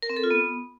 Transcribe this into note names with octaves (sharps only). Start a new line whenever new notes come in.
A#4
C4
A4
F4
B3